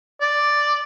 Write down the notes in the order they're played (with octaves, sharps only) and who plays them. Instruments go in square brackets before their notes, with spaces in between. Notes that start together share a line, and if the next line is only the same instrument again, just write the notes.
[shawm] D5